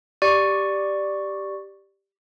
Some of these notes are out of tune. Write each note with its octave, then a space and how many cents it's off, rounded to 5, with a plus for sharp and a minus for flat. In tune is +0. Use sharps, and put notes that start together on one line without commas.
G4 +0 D5 +5 C#6 +0